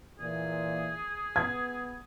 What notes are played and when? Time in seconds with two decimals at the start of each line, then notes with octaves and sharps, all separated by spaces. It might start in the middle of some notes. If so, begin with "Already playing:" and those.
0.19 A#2 E3 G#4
1.36 B3 B4 G#6